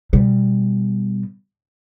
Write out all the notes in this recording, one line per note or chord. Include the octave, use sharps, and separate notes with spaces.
B2 G3